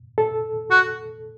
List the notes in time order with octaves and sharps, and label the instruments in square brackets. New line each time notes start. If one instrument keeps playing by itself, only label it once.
[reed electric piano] A4
[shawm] F#4